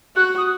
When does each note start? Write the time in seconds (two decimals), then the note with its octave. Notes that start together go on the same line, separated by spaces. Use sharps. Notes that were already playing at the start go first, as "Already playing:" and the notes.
0.16 F#4 F#6
0.37 D#6